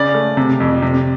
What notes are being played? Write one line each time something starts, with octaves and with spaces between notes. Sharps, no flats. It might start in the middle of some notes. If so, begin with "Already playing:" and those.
Already playing: C#3 D5
A3
C3
F2
C3